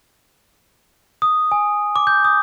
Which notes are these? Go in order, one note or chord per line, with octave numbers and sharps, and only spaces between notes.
D#6
G#5
D6
G6
D#6